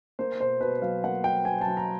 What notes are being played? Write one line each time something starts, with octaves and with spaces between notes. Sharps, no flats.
A#3 C5
B2 C5
B2 B4
F#3 F5
A#3 F#5
B2 G5
B2 G#5
A5
F#3
A#5